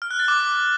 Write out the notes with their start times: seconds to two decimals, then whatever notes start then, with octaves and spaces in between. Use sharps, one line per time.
0.02 F6
0.11 F#6
0.19 A6
0.28 D6